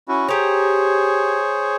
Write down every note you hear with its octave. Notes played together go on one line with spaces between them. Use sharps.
C#4 E4 F#4
G4 G#4 C5 C#5 A#5